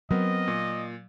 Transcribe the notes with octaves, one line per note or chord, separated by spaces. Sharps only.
F#3 B3 C4 A#4 D#5
A#2